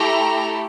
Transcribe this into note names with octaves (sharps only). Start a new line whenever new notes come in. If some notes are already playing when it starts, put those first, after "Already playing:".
Already playing: A3 E4 G4 A#5